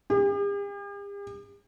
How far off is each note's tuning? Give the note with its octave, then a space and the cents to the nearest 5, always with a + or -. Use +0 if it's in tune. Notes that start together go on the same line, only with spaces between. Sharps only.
G4 +45